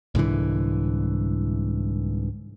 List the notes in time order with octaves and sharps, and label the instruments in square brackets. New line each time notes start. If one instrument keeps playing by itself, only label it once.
[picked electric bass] C2 G#2 D3 E3